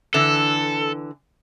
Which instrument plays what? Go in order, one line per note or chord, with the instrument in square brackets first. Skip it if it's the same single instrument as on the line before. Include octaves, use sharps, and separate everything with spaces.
[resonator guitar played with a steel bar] D3 E3 [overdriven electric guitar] A4